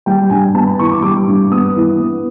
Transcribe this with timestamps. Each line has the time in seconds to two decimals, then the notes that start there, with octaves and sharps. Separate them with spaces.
0.06 G3 G5
0.30 G2 G#5
0.54 B3 A5
0.66 B5
0.79 E3 C#6
0.91 D6
1.02 G3 D6
1.27 G2
1.51 B3 D#6
1.76 E3
2.00 B3